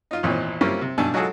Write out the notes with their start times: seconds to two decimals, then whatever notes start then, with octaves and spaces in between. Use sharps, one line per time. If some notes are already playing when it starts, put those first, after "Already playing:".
0.11 D#4 F4
0.23 G#1 E2 A#2 C4 D#4 C#5
0.61 G3 A#3 C4 C#4 E4 F4
0.81 C3
0.98 G2 B2 D4 G#5 A5 E6
1.14 F#3 G#3 F4 F#4 G#4 A4